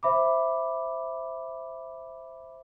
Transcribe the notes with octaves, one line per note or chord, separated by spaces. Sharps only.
C5 E5 B5 D6